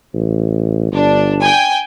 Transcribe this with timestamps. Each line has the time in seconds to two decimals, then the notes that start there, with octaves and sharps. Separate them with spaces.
0.14 A1
0.92 G1 D4
1.40 G5 G#5